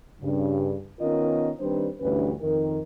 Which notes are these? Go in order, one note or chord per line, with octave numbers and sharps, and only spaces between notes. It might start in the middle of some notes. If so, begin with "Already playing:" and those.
G2 C#3
D#3 B3 C#4 F4 A#4 D#5
D#3 G3 C4 D4 B4 C5
D2 G2 E3 C#4 G4 B4
F2 D#3 A#4